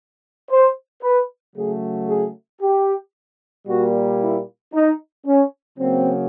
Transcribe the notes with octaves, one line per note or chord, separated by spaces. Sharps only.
C5
B4
C#3 F#3 A3 G#4
G#4
G4
A#2 G3 A#3 F#4
E4
D#4
C#4
C#3 F#3 A#3 C4